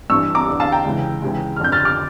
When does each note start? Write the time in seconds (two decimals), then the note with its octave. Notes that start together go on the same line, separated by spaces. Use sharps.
0.10 G2 E3 C#6 E6
0.35 A#5 D6
0.47 E2 D3
0.60 F5 A5
0.72 G5 A#5
0.85 C#2 C#3 E3
1.22 C#2 C#3 E3
1.56 F6
1.60 F2 D3 G6
1.72 F6 A6
1.85 D6 F6